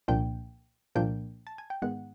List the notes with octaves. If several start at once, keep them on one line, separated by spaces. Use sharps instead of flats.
C2 A#2 F3 A#3 D4 G5
C2 A#2 F3 A#3 D4 G5
A5
G#5
G5
G#2 D#3 G#3 B3 F#5